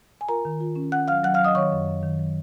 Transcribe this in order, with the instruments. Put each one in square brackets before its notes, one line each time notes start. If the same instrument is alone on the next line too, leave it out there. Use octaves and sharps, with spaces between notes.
[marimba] G#5
F4 A#4 A#5
D#3
F4
C#4
C#4 F#5 F#6
F#3 F5 F6
F#3 F#5 F#6
F5 F6
F#3
D#5 D#6
D#3 C#5 C#6
F#2
F#2
D#3
F#3